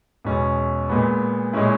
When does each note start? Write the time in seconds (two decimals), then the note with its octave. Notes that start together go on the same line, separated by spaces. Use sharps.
0.25 E2 B2 G#3 C#4
0.89 A#2 G#3 B3
1.53 A#2 G#3 C#4 E4